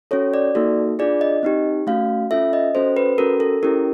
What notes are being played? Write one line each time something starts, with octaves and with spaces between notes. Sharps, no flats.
C#4 F#4 A4 C#5
D5
A#3 D#4 F#4 A4
D4 F4 G#4 D5
D#5
C4 D#4 G4
A3 C#4 F#4 F5
C#4 F4 A4 E5
D#5
C#4 F#4 A4 C5
B4
C#4 F#4 A4 A#4
A4
C#4 E4 G4 A#4